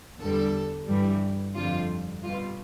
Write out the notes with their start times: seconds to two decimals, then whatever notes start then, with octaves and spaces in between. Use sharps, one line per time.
0.20 E2 D3 G3 A4
0.88 G2 E3 G3
1.56 F2 D3 G3 F4
2.23 B2 G3 F4